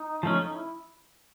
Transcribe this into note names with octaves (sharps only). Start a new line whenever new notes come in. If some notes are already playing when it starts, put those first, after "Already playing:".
Already playing: D#4
F3 A3 C#4
E4